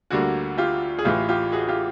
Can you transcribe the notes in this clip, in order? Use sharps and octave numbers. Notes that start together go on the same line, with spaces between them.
D2 D3 G3 A#3 F#4
F4 G4
G#4
A1 A2 E3 F4 G4
F4 G4
F#4 G#4
F4 G4